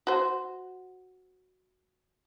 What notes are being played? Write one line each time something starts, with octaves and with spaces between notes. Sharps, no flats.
F#4 C5